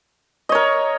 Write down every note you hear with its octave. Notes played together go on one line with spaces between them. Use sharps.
A#4 C#5 D#5